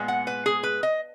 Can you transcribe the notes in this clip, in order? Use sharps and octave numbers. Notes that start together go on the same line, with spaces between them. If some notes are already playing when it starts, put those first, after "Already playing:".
Already playing: A#2 G#3 B3
F#5
B4
G#4
B4
D#5